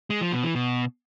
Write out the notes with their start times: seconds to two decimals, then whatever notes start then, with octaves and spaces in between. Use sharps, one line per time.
0.10 G#3
0.21 F3
0.32 B2
0.44 E3
0.55 B2